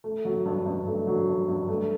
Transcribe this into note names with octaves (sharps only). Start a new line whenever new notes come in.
A3
F#3
G2
G2
A3
F#3
G2
G2
A3